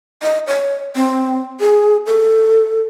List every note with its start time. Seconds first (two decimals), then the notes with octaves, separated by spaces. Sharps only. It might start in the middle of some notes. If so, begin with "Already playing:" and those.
0.23 D#5
0.47 C#5
0.96 C4
1.60 G#4
2.06 A4